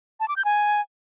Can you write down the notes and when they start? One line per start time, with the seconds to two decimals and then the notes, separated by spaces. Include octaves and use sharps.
0.20 A5
0.28 D6
0.37 G6
0.45 G#5